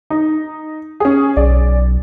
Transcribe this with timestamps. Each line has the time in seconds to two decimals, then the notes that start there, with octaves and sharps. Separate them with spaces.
0.10 D#4
1.00 C#4 G#4
1.37 B1 D5